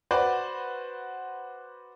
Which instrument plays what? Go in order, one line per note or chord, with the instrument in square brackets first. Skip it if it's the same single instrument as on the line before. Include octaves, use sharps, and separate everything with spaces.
[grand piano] F#4 B4 C5 D5